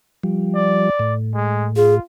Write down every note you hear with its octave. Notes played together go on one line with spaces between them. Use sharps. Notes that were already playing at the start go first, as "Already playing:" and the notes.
F3 G3
D5
A2
G#3
F4 G#4